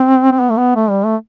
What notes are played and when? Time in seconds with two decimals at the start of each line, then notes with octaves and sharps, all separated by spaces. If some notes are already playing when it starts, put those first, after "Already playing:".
Already playing: C4
0.32 C4
0.40 B3
0.50 A3
0.57 B3
0.76 A3
0.90 G3
1.05 A3